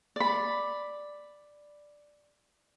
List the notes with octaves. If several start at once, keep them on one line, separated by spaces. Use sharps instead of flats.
D5 B5